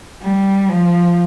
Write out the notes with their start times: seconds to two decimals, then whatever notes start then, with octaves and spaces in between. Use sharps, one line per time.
0.22 G3
0.69 F3